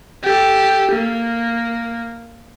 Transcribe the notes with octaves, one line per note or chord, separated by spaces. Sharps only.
G4 A4
A#3